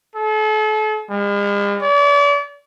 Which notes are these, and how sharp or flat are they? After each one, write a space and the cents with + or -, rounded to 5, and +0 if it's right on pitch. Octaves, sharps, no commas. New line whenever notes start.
A4 -40
G#3 -45
D5 -40